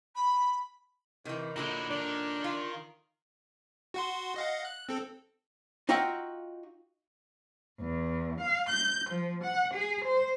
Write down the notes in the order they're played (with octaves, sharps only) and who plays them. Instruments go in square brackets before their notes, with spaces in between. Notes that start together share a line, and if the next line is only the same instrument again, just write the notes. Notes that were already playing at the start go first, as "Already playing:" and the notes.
[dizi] B5
[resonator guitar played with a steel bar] C3 E3 [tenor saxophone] D#3
[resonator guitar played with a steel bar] A#2 D3 F#3 [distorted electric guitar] D#4 E4
[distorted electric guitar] D#3 A#4 [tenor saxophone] D4
[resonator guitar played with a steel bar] F4
[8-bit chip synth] F#4 F#5 C6
D#5 F5 F#5
F#6
C4 A4
[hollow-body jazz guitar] D#4 F4 F#4 E5 F#5 G5
[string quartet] E2
F5
G6
F3
F#5
G#4
C5